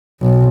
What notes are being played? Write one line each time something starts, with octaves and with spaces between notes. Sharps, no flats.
B1